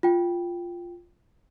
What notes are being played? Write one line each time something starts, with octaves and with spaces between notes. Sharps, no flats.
F4 G5